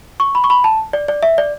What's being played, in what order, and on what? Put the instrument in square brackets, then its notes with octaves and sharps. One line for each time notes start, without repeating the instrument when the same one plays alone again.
[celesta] C#6
B5
C#6
B5
A5
D5
D5
E5
D5